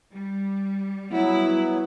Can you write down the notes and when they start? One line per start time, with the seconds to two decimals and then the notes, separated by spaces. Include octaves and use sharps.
0.12 G3
1.11 F#3 B3 E4